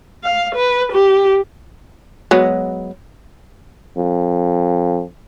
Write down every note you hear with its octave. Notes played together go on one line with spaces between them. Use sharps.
F5
B4
G4
F#3 G#3 B3
F2